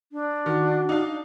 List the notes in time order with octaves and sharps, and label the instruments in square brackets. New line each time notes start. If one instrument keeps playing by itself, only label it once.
[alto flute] D4
[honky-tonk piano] D#3 [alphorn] F#4
[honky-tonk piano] D#4 F5